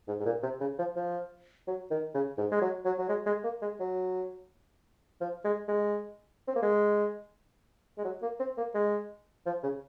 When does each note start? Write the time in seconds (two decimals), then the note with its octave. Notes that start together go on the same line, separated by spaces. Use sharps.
0.08 G#2
0.20 G#2
0.26 A#2
0.43 C3
0.61 C#3
0.79 F3
0.96 F3
1.67 F#3
1.91 D#3
2.15 C#3
2.38 G#2
2.52 G#3
2.62 F#3
2.85 F#3
2.98 F#3
3.09 G#3
3.26 G#3
3.44 A#3
3.62 G#3
3.80 F#3
5.21 F3
5.45 G#3
5.68 G#3
6.48 C4
6.56 A#3
6.62 G#3
7.98 G#3
8.04 F#3
8.22 A#3
8.40 C4
8.58 A#3
8.75 G#3
9.46 F3
9.63 C#3